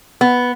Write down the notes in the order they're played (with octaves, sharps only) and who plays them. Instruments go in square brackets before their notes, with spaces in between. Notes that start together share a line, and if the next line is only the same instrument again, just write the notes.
[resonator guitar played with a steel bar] B3